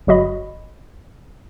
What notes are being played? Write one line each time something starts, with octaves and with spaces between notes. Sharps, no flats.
G1 F#3 F#4 D#5 B5